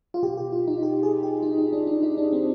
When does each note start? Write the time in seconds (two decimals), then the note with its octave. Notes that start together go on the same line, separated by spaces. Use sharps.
0.14 F4
0.22 B2 G4
0.37 G4
0.52 F4
0.67 D#4
0.83 G4
1.03 G#4
1.23 G4
1.42 D#4
1.58 D#4
1.73 D4
1.87 D4
2.03 D#4
2.17 D4
2.32 C4